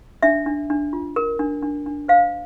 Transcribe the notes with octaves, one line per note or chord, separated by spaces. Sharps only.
D4 E5
D4
D4
F4
A#4
D4
D4
D4
C5 F5